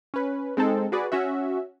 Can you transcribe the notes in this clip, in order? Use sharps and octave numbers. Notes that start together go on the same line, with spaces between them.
C#4 B4
G#3 C4 D#4 A4
F#4 G#4 B4 D5
C#4 F#4 E5